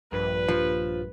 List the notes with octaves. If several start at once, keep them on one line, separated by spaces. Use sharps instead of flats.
A#1 G2 B4
F3